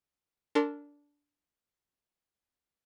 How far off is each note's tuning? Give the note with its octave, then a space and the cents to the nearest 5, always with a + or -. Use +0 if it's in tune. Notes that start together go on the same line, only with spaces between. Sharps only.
D4 -15 A#4 -35 C6 +10